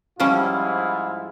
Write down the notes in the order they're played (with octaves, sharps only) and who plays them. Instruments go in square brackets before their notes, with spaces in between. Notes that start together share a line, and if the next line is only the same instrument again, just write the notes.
[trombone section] G#2 E4 F4 [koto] F3 G3 C#4